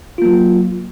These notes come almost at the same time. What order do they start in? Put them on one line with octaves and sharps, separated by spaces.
F4 A#3 F#3